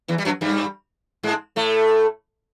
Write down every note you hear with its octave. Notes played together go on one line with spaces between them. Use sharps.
E2 E3
G3
F#2 F#3
G2 G3
G#2 G#3
A2 A3